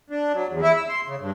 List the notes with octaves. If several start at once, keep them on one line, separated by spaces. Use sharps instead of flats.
D4
F#3
E2
E4
E6
C6
C#3
G2